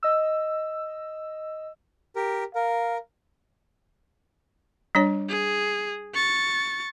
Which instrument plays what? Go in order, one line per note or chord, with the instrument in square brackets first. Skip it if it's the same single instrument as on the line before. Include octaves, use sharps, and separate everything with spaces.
[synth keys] D#5 E6
[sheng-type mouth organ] G4 A#4
[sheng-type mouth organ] A#4 [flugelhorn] F5
[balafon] G3 D4 C#5
[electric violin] G#4
C#6 A6